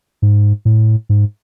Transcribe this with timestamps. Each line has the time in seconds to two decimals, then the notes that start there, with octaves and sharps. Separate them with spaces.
0.22 G#2
0.65 A2
1.09 G#2